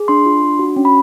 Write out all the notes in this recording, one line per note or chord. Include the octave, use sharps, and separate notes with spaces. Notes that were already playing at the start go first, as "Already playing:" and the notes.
Already playing: G#4
D4 C6
F4
D4
F#4
C#4
B5